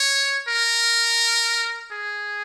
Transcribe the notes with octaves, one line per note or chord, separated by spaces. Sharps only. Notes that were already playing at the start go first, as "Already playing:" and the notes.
Already playing: C#5
A#4
G#4